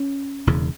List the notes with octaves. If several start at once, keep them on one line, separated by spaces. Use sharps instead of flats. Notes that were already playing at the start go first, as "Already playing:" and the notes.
Already playing: C#4
E1 E2 C#3